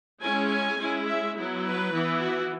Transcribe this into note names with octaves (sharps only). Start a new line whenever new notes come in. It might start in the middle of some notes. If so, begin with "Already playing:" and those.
G#3 C#4 E4 G#5
G#5
G#3 C#4 E4
E5
F#3 B3 E4
B4
E3 B3 E4
F#4